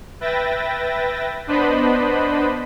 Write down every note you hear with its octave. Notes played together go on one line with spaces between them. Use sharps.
B4 E5 G5 A6 A#6
B3 D4 B4 C5 D#5 B5